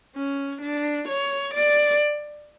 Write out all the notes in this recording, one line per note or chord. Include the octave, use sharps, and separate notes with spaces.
C#4
D4
C#5
D5